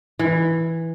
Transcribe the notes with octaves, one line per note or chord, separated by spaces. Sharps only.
E3